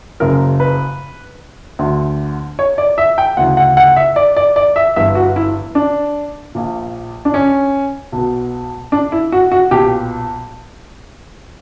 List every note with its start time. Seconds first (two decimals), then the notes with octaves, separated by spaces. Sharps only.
0.20 F#1 F#2 C#3 A#4
0.60 B4
1.79 D2 D3
2.59 C#5
2.78 D5
2.98 E5
3.18 G5
3.37 D2 C#3 E3 F#5
3.57 F#5
3.77 F#5
3.96 E5
4.16 D5
4.37 D5
4.56 D5
4.76 E5
4.96 G1 G2 E3 E5
5.15 F#4
5.36 E4
5.75 D4
6.55 A#1 A#2
7.25 D4
7.34 C#4
8.12 B1
8.18 B2
8.92 D4
9.12 E4
9.32 F#4
9.52 F#4
9.71 B1 A#2 G4